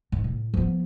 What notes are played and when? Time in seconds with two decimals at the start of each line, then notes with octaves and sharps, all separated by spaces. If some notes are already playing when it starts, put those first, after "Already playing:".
0.12 G#2
0.24 A2
0.54 F3 B3